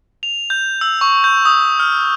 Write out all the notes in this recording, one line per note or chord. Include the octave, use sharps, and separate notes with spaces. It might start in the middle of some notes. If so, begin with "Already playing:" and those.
F7
G6
E6
C#6
G6
D#6
F6